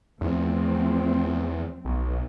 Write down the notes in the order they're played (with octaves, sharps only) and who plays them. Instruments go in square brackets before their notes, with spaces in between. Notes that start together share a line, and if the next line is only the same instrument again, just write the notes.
[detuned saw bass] E2 [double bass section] F3 A3 C4
[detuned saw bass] B1